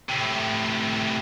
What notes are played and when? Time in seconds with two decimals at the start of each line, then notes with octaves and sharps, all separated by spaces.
0.09 A2 C3